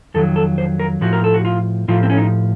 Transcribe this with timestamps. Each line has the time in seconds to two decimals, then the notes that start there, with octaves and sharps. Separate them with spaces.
0.14 F2 D#3 F#3 A4
0.36 A4
0.58 C5
0.80 A#4
1.01 A2 F3 F#4
1.13 A#4
1.24 A4
1.34 F#4
1.45 F4
1.88 A2 F3 F4
2.03 C4
2.10 C#4
2.17 D#4